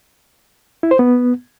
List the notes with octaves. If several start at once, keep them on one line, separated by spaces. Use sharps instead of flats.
E4
C5
B3